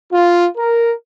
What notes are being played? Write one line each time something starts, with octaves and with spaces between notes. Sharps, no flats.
F4
A#4